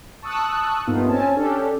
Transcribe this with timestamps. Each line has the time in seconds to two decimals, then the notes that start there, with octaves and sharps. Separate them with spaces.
0.22 A5 C#6 D#6 E6 F#6
0.87 G2 A#2 A3 B3 D#4 F4
1.08 C4 C#4 G#5 A5
1.36 C#4 D4 G4 A4